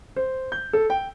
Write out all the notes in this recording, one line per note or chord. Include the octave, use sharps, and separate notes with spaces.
C5
G6
A4
G5